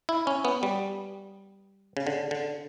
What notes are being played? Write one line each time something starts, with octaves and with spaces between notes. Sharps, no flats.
E4
C#4
B3
G3
C#3
D3
D3